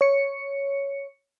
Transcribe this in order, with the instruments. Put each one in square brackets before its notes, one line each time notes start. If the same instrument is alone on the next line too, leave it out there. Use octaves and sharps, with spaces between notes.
[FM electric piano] C#5 C#7